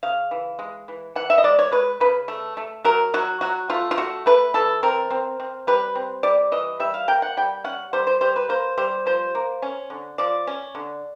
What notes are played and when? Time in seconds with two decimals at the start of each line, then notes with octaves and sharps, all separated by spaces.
0.03 C#3 F5
0.31 E3
0.59 G#3
0.88 E3
1.15 E3 F#5
1.30 E5
1.38 D#5
1.44 G#3 D5
1.59 C#5
1.72 G#3 B4
2.00 C#3 B4
2.28 A3
2.57 A3
2.84 F#3 A#4
3.14 F#3 F#4
3.41 F#3 F#4
3.70 A3 F4
3.91 F4
3.97 A3 F#4
4.26 A3 B4
4.54 E3 A4
4.83 C4 A#4
5.10 C4
5.40 C4
5.67 G3 B4
5.95 C4
6.23 G3 D5
6.52 E3 D#5
6.80 G3 E5
6.94 F5
7.08 A#3 G5
7.22 F#5
7.37 G3 G5
7.64 C#4 F#5
7.93 G3 C5
8.07 C5
8.21 G3 C5
8.36 B4
8.49 A#3 C5
8.78 G3 C5
9.06 F3 C5
9.35 A#3
9.62 C#4
9.90 D3
10.18 F3 D5
10.47 C#4
10.75 D3